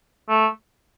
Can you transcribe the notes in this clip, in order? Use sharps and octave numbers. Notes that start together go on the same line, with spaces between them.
A3